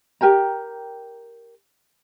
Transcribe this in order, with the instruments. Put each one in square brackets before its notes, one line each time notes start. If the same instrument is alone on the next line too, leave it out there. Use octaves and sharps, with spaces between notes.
[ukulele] G4 A#4 G5 A#5